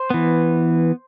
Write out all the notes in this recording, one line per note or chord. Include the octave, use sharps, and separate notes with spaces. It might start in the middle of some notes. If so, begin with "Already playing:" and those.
Already playing: C5
E3 B3